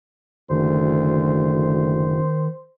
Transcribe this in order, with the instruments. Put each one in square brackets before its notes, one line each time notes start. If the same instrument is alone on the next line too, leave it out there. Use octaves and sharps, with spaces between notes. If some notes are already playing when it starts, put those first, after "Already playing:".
[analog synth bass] F#1 [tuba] D2 [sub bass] D#3 [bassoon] C5